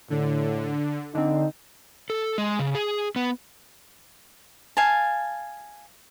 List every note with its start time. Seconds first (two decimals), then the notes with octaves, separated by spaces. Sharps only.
0.10 A2 D3
1.15 D3 C4 D#4
2.10 A4
2.38 G#3
2.59 C#3
2.75 G#4
3.16 B3
4.77 F5 G#5 A5